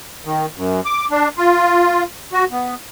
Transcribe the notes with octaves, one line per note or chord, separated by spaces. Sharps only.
D#3
F#2
D6
D4
F4
F#4
B3